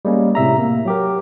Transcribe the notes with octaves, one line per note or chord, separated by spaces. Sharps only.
G3 G#3 A#3 C#4
A2 C3 E5 A#5
A#3
F#3 G4 A#4